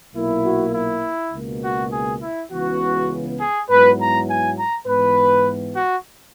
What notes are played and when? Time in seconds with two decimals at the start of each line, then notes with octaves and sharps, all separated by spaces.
0.16 B1 A#2 A#3 E4
0.46 F#4
0.74 E4
1.33 C#2 B2 A#3
1.64 F#4
1.93 G#4
2.23 E4
2.51 C#2 C#3 E3 B3 F#4
3.41 G#4
3.70 G#2 F#3 B3 E4 B4
3.99 A#5
4.29 G#5
4.57 A#5
4.87 G#2 E3 B3 B4
5.75 F#4